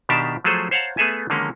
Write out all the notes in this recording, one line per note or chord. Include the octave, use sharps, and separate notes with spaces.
B2 D#3 D4 G4 E5 A5
F3 F#3 A3 G#4 A4 C5
C5 C#5 F5 F#5 A5 A#5
A3 B3 G#4 A4 E5 G#5
D3 D#3 F3 G#3 A#3 C#4